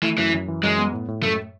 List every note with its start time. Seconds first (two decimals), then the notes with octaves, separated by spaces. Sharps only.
0.03 E3 A3
0.18 F#2 E3
0.33 F#2
0.48 E3
0.63 F#2 G#3
0.78 B3
0.93 A2
1.08 A2
1.23 F#2 A3